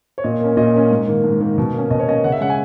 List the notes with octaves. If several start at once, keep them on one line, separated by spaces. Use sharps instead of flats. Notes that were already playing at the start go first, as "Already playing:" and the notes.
C#5
A#2 D#5
A#3 C#4
A#2 D#5
A#3 C#4
G#2
D#3 A#3
G#2
D#3 A#3
B2
A#3 C#4
B2 D#5
C#5
A#3 C#4 D#5
C#3 F#5
E5
G#3 C#4 F#5
G#5